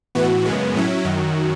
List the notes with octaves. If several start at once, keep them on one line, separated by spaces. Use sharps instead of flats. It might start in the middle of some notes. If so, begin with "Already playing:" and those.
A2 E3 B3 F#4
F#2 C#3 G#3 B3
A2 F#3 C#4 E4
F#2 D#3 F#3